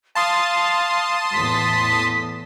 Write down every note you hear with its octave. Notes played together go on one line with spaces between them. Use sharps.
F5 A5 C6 D#6
E2 A2 B6